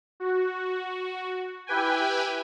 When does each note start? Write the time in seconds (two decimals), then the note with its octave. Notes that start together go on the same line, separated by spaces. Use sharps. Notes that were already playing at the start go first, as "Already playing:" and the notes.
0.20 F#4
1.67 E4 G4 B4 G5 G#5